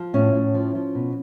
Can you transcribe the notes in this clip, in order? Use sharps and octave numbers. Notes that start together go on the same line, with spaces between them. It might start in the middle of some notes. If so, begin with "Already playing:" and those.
Already playing: F3
A2 C#4
A2
F3
F3
B2